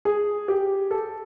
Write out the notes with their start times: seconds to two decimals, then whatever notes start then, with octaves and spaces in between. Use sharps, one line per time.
0.05 G#4
0.48 G4
0.91 A4